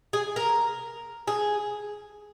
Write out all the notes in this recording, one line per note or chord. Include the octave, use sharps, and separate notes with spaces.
G#4
A#4
G#4